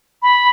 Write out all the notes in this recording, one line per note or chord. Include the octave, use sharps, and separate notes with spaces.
B5